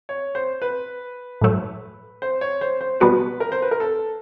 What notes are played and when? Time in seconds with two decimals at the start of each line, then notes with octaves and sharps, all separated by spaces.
0.09 C#5
0.35 C5
0.62 B4
1.42 A2 F#3 A3
2.22 C5
2.41 C#5
2.61 C5
2.81 C5
3.00 B2 G3 B3 D4 F#4 B4
3.40 A#4
3.52 C5
3.62 B4
3.71 A#4
3.80 A4